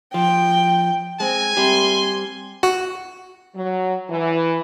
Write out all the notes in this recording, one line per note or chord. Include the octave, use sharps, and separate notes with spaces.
F3 G5
G#3 C4 G#5
G3 C4 G4 C6
F#4
F#3
E3